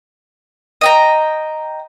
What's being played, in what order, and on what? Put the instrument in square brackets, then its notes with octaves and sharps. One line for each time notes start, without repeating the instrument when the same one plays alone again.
[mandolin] D#5 G5 A#5